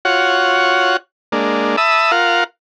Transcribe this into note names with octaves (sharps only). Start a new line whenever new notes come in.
F4 F#4 C#5 F#5
G#3 A#3 D4
E5 A5 B5 D#6 E6
F4 A#4 F5 F#5